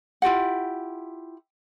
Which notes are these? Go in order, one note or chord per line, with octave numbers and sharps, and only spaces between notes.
E4 F4 G4 F#5